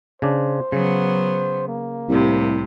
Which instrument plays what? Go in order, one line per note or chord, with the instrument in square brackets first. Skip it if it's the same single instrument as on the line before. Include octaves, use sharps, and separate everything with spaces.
[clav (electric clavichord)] C#3 D4 [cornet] C5
[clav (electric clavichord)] C#3 [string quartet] F#3 B3
[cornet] A#3
[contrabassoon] C2 [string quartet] A2 C3